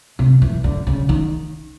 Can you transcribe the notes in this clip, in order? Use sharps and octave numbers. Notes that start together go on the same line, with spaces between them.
C3
E3
D3
C#3
D#3